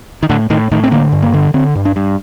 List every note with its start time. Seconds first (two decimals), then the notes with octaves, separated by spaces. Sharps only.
0.23 D#3
0.29 A2 D3
0.50 A2 D#3
0.71 A2 D#3
0.83 C4
0.91 D3 A#3
1.12 G2
1.22 A#3
1.34 D3
1.54 D3 C4
1.75 G2
1.85 D4
1.96 G2